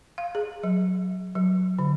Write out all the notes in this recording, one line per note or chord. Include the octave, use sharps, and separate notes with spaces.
F5
G#4
F#3
F#3
D3